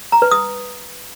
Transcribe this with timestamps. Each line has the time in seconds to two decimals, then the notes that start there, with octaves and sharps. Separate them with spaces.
0.12 A#5
0.22 B4
0.31 D#6